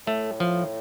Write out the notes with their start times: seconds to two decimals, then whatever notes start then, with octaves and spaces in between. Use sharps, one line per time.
0.07 A2 A3
0.40 F3